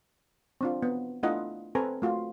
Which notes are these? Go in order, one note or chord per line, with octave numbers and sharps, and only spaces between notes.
C4 D4 F4
B3
A3 D4 E4 F4 D#5 F#5
C4 A4 B4 G#5 A#5
A3 F4 F#4